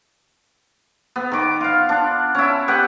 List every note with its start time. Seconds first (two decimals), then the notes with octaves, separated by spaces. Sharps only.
1.16 B3
1.32 D#3 D6
1.61 F4 F5
1.89 D4
2.35 C#4 E4
2.68 B3 G4 B4 F#5